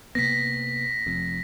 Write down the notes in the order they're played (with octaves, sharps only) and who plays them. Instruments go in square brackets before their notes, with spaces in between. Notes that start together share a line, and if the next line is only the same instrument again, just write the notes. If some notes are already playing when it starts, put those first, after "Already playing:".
[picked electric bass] C3 A#3 B3 [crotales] A#6 B6
[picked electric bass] F1 F2